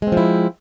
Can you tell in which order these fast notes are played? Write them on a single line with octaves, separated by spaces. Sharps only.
G#3 C4 F3 E4